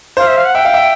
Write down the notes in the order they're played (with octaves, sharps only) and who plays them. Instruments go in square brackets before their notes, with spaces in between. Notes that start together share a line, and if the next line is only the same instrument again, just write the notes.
[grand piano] C5 [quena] F5
[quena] E5
F5
F#5
[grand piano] E5 [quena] G5
[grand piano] F5
E5